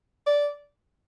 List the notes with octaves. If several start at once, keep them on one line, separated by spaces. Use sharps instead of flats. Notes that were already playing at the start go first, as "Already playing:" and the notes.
D5